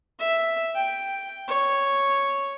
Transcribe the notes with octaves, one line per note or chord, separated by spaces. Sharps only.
E5
G5
C#5